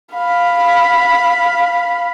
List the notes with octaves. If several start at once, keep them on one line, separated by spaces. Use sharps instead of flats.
F5 B5